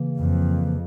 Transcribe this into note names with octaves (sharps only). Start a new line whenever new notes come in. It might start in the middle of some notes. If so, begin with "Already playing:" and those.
Already playing: C#3 E3 A#3
F2